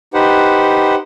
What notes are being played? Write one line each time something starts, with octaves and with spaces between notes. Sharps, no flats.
D#4 G4 B4 C5 F#5